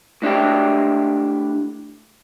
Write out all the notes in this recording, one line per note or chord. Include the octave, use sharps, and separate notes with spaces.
A2 D4 E4 G4